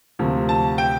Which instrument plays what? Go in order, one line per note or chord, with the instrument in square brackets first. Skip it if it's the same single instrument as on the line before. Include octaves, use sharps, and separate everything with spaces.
[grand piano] D2 C3 F3 A#3
A5
G5